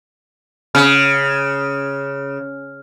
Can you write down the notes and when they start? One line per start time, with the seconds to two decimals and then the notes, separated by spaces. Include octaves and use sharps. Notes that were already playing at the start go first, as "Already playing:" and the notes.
0.75 C#3 F6